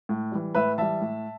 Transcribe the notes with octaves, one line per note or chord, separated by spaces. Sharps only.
A2
E3 G3
A2 B4 E5
E3 G3 E5 A5
A2